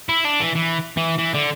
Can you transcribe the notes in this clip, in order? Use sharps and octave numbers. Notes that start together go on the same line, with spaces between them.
E4
D4
E3
E3
E3
E3
D3